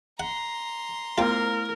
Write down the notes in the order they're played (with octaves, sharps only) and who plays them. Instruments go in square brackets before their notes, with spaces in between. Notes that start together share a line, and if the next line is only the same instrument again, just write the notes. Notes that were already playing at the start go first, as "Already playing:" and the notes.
[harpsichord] F#5 [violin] A#5 C6
[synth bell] A3 B3 E4 [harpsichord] F4 G5 [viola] A#4